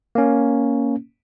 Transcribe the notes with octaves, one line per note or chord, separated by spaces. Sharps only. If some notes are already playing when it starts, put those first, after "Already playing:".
A#3 C#4